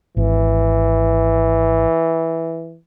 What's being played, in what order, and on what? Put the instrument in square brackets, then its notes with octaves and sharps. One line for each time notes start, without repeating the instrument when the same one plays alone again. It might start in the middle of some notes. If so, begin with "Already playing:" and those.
[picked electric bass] G#1 [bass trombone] E3